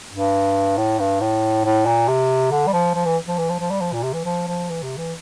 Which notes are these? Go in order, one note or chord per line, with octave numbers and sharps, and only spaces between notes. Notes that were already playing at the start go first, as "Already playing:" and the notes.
G2
A2
G2
A2
A2
A#2
C3
D3
G3
F3
F3
E3
F3
E3
F3
F3
G3
F3
A#2
C3
E3
F3
F3
E3
C3
E3